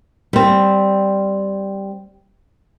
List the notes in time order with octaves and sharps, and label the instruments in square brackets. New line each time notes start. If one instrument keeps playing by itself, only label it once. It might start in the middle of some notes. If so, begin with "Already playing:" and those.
[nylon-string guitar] G3 C4